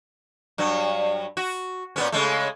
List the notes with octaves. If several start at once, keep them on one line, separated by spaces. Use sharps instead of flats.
G2 F#3
F#4
A#2 B3 C#4
C#3 G#3 A3